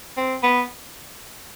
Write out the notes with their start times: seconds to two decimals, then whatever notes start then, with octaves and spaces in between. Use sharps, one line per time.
0.17 C4
0.43 B3